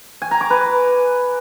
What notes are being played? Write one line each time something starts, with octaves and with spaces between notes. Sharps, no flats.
G#5
A#5
D6
B4